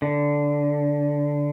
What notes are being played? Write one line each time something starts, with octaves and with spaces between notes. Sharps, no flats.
D3